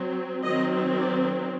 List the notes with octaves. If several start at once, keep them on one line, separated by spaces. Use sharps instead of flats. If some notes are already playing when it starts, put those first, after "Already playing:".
Already playing: F#3 C4
D#3 F#3 C4 D#5
D5